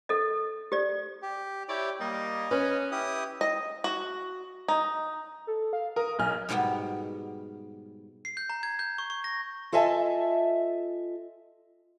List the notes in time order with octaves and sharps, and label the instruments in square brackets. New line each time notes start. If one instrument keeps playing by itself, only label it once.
[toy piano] A4 D#5
G4 D5
[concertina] G4
[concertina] E4 C#5 [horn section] G4 D5 G5
[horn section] G3 A#3 [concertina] D#5
[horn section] C#4 [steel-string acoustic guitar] B4
[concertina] E4 G4 D#6
[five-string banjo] D#5
F#4
D#4
[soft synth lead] A4
F5
[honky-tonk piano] A#4 [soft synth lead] D#6
[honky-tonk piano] B1 F6 [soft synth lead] G#5
[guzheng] G#2 B2 F#3 G3 B3
[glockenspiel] C7
G6
A#5
G#6
G6
C#6
C#6
A#6
[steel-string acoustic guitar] F4 A4 D#5 E5 G#5 A5